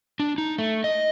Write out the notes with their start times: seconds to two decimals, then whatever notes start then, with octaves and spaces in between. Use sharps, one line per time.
0.20 D4
0.38 D#4
0.58 A3
0.84 D#5